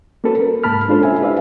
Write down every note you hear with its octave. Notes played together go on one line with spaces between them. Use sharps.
A#3 C#4 F#4 A4 B4
A#4
C2 G#2 A#3 A5 B5 F6
G#3 C#4 D4 F4 A4 C5
C#4 E5 G#5
E4 G4 B4 D5 E5 F5